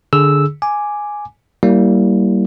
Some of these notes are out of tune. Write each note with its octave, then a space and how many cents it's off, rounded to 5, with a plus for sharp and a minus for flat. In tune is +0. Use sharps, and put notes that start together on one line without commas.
D3 +0 G#4 +0 E6 -5
G#5 +0 D6 +0
G3 -30 A#3 -5 E4 -25